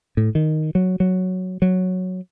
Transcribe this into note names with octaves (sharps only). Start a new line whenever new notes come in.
A2
D#3
F#3
F#3
F#3